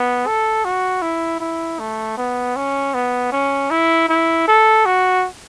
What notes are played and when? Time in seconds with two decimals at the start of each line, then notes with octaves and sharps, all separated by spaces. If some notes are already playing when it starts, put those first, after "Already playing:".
Already playing: B3
0.27 A4
0.65 F#4
1.02 E4
1.40 E4
1.79 A3
2.18 B3
2.56 C#4
2.94 B3
3.32 C#4
3.71 E4
4.09 E4
4.48 A4
4.86 F#4